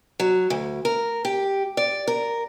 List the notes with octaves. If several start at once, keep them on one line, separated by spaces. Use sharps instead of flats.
F#3
D2
A#4
G4
D5
A#4